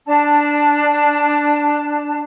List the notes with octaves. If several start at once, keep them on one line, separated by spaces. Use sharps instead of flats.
D4 A5